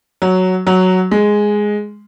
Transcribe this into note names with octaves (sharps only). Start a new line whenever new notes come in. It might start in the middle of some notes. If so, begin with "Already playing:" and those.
F#3
F#3
G#3